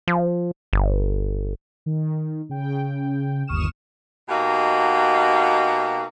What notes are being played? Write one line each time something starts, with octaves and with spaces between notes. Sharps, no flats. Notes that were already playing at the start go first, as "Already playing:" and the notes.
F3
G1
D#3
C#3 G5
G1 D#2 C#6 D#6 F6 E7
B2 A#3 D#4 F#4 G4